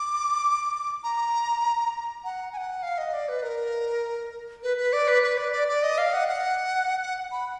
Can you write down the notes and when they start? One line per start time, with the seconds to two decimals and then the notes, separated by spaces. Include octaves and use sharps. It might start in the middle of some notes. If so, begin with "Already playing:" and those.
Already playing: D6
1.04 A#5
2.24 F#5
2.53 G#5
2.57 F#5
2.83 F5
2.98 D#5
3.13 D5
3.29 B4
3.43 A#4
4.63 B4
4.77 B4
4.93 D5
5.08 B4
5.23 B4
5.38 D5
5.52 D5
5.68 D5
5.83 D#5
5.98 F5
6.13 F#5
6.28 F#5
7.02 F#5
7.32 B5